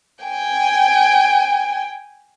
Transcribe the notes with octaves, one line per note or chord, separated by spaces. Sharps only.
G5 G#5